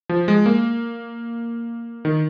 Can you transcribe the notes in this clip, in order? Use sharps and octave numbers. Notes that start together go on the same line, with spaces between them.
F3
G#3
A#3
D#3